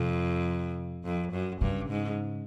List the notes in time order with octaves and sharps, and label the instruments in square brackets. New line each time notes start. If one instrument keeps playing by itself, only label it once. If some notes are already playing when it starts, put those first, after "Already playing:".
Already playing: [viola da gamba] F2 [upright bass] C3
[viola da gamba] F2
F#2
[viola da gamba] G2 [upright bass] C#3
[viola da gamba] G#2